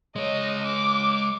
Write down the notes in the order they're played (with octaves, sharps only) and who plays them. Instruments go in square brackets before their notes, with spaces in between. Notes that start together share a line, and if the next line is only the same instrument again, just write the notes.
[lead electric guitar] G#3 C#5 [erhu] D#5
[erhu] D6